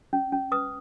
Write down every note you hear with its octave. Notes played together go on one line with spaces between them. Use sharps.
C#4
C#4
B4 D#6